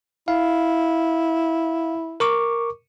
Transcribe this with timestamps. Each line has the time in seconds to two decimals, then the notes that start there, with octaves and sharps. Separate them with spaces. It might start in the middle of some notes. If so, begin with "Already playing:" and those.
0.28 E4 F5
2.20 A#4 C#6 D6